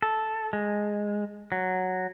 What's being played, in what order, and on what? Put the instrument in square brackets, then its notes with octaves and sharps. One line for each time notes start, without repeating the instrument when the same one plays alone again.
[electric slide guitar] A4
G#3
F#3